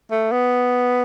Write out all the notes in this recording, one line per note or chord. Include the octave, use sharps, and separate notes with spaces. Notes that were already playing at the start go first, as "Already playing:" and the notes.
A3
B3